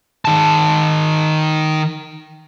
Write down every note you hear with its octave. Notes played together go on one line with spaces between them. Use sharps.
D#3 A5